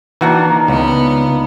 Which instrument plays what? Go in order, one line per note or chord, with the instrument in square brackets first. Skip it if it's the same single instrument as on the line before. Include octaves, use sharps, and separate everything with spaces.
[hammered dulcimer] D#3 A#3 D4 [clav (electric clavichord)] E3 F#4
[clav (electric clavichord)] C#2 [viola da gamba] B3